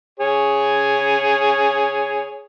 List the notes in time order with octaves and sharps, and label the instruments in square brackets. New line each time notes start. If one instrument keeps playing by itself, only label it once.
[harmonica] G#4 C#5